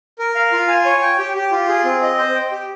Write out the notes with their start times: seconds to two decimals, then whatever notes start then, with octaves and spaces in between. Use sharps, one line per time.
0.19 A#4
0.35 F5
0.52 F4
0.68 G#5
0.85 C#5
1.02 G5
1.19 G4
1.35 G4
1.52 F4
1.68 G#4
1.85 C4
2.02 D#5
2.18 C5
2.35 G5
2.52 G4